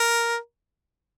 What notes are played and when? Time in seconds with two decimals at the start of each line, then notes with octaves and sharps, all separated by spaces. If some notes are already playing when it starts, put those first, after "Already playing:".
Already playing: A#4